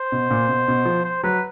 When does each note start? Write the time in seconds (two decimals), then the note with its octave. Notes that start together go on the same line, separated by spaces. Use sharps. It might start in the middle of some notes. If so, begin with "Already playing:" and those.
Already playing: C5
0.12 B2
0.31 A#2
0.49 B2
0.68 B2
0.85 F3
1.05 C5
1.23 F#3 B4